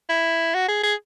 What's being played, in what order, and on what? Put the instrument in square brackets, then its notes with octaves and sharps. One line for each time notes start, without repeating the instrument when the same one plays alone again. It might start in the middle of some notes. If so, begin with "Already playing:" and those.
[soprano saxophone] E4
F#4
G#4
G#4